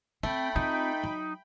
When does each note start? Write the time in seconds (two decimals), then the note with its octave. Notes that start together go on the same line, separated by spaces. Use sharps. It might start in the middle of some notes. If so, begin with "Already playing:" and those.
0.23 A3 C4 G5 B5
0.56 C4 D#4 F4
1.04 F#3